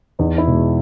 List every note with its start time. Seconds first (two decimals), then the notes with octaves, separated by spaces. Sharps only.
0.19 E2 D#4
0.38 E4
0.47 B2 G#3